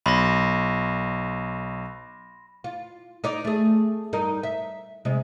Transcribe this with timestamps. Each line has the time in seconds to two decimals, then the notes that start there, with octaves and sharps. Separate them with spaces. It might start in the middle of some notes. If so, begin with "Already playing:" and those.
0.06 B1 B5 C6 A#6
2.64 F4
3.24 D#4 C#5 D5
3.45 A3 G#4
4.13 G2 D#4 A#4
4.43 E5
5.05 C3 G#3